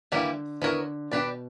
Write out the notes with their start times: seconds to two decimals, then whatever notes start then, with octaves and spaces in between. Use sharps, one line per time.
0.12 D3 E3 G3 A#3 E4 G4
0.62 D3 B3 E4 A#4 C#5
1.11 B2 D4 G4 B4 D5